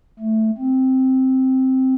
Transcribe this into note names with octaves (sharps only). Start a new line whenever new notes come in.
A3
C4